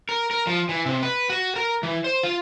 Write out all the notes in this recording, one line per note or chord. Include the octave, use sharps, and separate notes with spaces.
A#4
A#4
F3
E3
C3
B4
F#4
A#4
E3
C5
F4